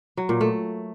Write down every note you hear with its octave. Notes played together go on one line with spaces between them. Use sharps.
F#3
A#2
A3